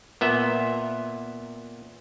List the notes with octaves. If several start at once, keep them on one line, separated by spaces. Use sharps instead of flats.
A#2 B3 E5